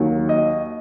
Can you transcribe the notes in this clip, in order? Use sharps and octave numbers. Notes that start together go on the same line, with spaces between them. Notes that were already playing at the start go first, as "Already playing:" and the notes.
Already playing: D#2 D#3 F#3
D#5